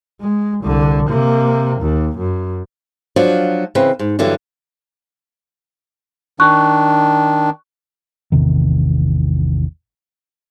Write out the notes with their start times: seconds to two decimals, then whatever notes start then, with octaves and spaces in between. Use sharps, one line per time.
0.21 G#3
0.63 C2 D3
1.09 C3 A#3
1.81 D#2
2.18 F#2
3.16 F3 F#3 D4 F4
3.75 C#3 E3 C4 B4
3.99 G#2
4.19 G2 D3 E3 F#3
6.40 D#3 D4 C#6 F#6
8.32 A1 E2 C3 D#3